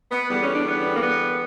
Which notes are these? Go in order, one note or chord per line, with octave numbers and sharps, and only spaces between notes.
B3
E2 D3 G3 B3
C#4
D4
B3
A#3
B3